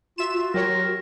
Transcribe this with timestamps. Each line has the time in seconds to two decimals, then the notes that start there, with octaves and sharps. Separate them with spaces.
0.18 F4 F#4 E5 E7
0.35 F4
0.54 F#3 G4 A#4 C#5